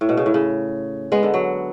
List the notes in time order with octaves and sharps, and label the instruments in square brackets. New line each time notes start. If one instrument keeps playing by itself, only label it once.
[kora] A2
B2
C#3
A2
C#3
G#3 B3
D3
F#3